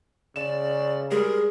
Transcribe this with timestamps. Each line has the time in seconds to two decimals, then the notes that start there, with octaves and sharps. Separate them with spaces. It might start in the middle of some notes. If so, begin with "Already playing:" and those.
0.36 C#3 D5 E7
1.11 G3 G#3 G#4 A#4